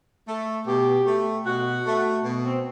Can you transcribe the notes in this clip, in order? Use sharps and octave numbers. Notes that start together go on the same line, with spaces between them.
A3 A4
B2 G4
A3
B2 F#4
A3
B2
C4